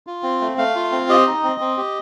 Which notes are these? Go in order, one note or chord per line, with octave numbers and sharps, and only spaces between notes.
F4
C4
A3
A3 F5
F4
C4
G4 D#5
D#4
C4
C4
G4